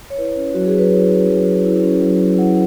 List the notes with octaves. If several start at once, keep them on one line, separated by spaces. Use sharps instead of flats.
C#5
E4 B4
C#4
F#3 F#4
G#4
F#3 B4
E4 C#5
C#4
F#3
F#3
E4
C#4
F#3
F#3
E4 F#5